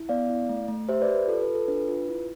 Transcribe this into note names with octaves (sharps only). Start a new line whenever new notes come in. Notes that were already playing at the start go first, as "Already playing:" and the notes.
Already playing: E4
B3 D5 F5
E4
A3
A3
G4 C5 E5
B4 D5
G4
B4
F4 A4
B4
F4
A4
D4 B4
F4
E4